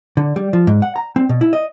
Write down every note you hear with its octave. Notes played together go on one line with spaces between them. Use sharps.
D3
G3
F3
G#2
F#5
A#5
C4
B2
E4
D#5